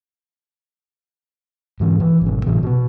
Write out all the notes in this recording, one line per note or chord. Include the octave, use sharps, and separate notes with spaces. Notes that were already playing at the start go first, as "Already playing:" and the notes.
G#2 E3
E3
G#1 B2
A2 C3 E3
B2 A#3 B3